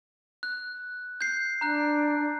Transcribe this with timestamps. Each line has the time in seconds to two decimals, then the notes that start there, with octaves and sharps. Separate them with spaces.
0.43 F#6
1.21 G6 C7
1.61 D4 A#5 F#6